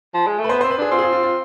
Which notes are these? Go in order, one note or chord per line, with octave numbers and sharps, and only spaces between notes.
F3
G#3
A3
B4
B3 C5
C4 C5
B4
D4 G#4
C4 F4
G#4
F4
F4
F4